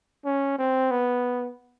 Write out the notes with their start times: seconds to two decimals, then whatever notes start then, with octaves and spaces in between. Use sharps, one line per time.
0.25 C#4
0.59 C4
0.91 B3